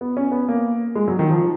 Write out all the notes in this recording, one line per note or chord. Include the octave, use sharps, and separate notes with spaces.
B3
C#4
B3
A#3
G#3
F#3
D#3
F3